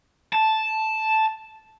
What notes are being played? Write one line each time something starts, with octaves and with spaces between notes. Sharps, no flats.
A5